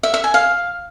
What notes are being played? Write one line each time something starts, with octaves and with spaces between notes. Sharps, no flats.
E5
E5
G#5
F5